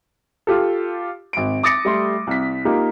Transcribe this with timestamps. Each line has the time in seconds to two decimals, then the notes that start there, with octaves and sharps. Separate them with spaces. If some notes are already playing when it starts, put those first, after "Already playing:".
0.47 F4 G4 A4
1.33 G#1 D7
1.63 D6 D#6 A6 A#6 C#7
1.85 G3 A3 C6
2.27 C2 B6
2.65 A#3 D#4 F4 G4